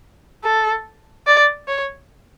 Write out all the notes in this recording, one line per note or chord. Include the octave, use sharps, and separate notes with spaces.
A4
D5
C#5